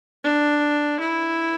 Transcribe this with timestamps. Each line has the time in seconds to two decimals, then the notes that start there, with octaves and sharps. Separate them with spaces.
0.24 D4
1.00 E4